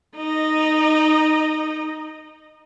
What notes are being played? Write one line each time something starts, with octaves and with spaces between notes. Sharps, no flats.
D#4 D#5